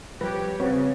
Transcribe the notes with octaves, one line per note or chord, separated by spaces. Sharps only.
F3 G3 G4 B4 C#5
C#3 C4 F#4 B4 C#5